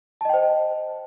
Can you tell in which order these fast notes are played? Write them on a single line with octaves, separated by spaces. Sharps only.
A5 D#5 G5 C5